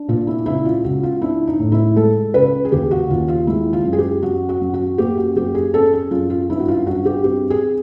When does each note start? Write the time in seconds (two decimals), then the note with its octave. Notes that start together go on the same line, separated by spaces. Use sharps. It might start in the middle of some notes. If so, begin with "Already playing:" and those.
Already playing: D4
0.08 A#2 F4
0.27 E4
0.46 C#2 E4
0.65 F4
0.84 C#2 F#4
1.03 F4
1.22 D4 E4
1.47 D#4
1.59 A2
1.72 E4
1.96 G#3 A4
2.34 C#2 B4
2.65 G#4
2.72 D#2 G4
2.91 F#4
3.09 D#2 F4
3.28 F4
3.47 G#3 E4
3.73 F4
3.85 F#2
3.93 G#4
3.98 G4
4.23 F#2 F#4
4.49 F#4
4.61 F#2
4.74 F#4
4.98 A#3 G4
5.17 F#4
5.36 F#2 G4
5.55 G#4
5.74 C#4 A4
5.93 G#4
6.11 F#2 F4
6.30 F4
6.50 G2 E4
6.60 F#4
6.68 F4
6.86 G2 F#4
7.05 G4
7.24 C4 G4
7.50 G#4